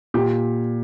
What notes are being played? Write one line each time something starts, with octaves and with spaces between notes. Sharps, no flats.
A#2 G4